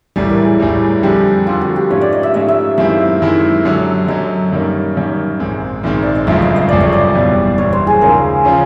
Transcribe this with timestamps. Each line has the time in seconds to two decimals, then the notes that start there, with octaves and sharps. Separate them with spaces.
0.16 A1 A2 E3 G3 A4
0.30 A#4
0.45 G#4
0.59 A1 A2 E3 G3
1.03 F2 D3 G3 G4
1.47 F2 D3 G3 F4
1.61 F#4
1.76 G4
1.90 G#2 F3 A3 C#4 F4 C#5
2.01 D5
2.12 D#5
2.23 E5
2.34 G#2 F3 A3 C#4 F4 D#5
2.48 E5
2.78 F#2 D#3 G#3 C4 E4 E5
3.22 F#2 D#3 G#3 C4 E4
3.65 F#2 D3 F#3
4.08 F#2 D3 F#3 D#5
4.52 F#2 D#3 G3 A#3 C#4
4.95 F#2 D#3 G3 A#3 C#4
5.39 A#1 G#2 D#3 G#3 C4
5.83 A#1 G#2 D#3 G#3 C4 E5
6.03 D5
6.15 D#5
6.27 G1 F#2 C#3 F3 G#3 E5
6.42 D#5
6.56 D#5
6.69 G1 F#2 C#3 F3 G#3 D5
6.81 C#5
6.92 D5
7.15 F#1 E2 B2 G3
7.58 F#1 E2 B2 G3 C#5
7.73 C5
7.87 G#4
8.01 D#2 C#3 F3 G#3 C#4 A#4
8.45 C#3 F3 G#3 C#4